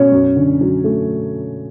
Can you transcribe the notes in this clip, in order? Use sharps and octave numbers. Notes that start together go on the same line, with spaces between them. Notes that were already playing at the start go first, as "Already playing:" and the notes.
Already playing: B2 C#4 C#5
F#2
D3
F#3
A3